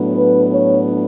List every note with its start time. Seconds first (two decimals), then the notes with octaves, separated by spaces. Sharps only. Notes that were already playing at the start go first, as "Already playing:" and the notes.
Already playing: A2 F#3 B3 D4
0.15 B4
0.52 C#5